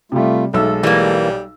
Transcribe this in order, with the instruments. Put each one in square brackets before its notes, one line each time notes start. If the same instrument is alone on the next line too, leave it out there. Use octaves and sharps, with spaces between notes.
[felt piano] C3 G3 [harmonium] A3 F4
[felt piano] B1 E6 [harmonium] G#3 A4 [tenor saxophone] A3
[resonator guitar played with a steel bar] E3 A#3 [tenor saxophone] G3